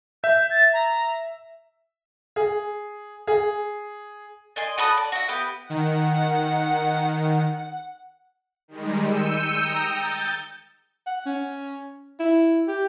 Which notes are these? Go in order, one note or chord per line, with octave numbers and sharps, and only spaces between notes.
E5 G6
A6
A#5
G#4
G#4
D5 D#5 G#5 C6
F#4 A4 B5 D#6
D5
F#4 E5
B3 G4 B4
D#3 F#5
D#3 G3 G#3
E6 G6 C#7 D#7 E7
G5 A#5 D#6
G6 A6
F#5
C#4
E4
G4